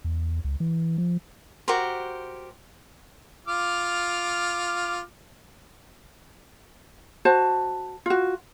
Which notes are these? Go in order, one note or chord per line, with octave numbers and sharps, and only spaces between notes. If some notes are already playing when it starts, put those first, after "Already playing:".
E2
C#2
E3
F3
F#4 G4 A#4 C5
F4 D6 F6
F#4 C5 A5
F4 F#4